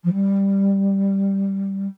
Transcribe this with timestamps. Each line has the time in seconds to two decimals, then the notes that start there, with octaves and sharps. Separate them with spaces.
0.04 F3
0.13 G3